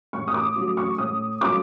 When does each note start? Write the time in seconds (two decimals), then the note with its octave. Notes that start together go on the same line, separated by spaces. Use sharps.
0.13 A2 C#6
0.28 D#6
0.34 D6
0.56 F#3 A3 C#4 F4
0.77 C#6
0.98 A2 D#6
1.41 F#3 A3 C#4 F4 D6